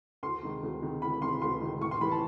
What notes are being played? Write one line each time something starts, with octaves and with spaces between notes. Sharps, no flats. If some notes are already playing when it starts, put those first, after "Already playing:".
D2 C6
C3 D#3 G#3
D2
C3 D#3 G#3
D2 B5
C3 D#3 G#3 C6
D2 C6
C3 D#3 G#3
A2 C#6
C6
E3 G3 B5
A5